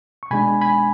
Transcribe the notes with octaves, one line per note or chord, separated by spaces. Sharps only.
C#6
B2 G#3 D4 G#5 B5
G#5 B5